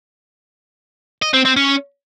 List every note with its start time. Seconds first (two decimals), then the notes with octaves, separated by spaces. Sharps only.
1.22 D#5
1.33 C4
1.45 C4
1.56 C#4